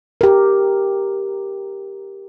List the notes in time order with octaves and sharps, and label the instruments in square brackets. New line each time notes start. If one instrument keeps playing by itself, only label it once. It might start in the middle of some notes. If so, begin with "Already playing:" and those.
[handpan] G4 A#4